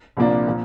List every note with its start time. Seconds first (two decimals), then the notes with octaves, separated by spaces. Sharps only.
0.17 C2 A#2 F3 A#3 D4
0.47 A#2 F3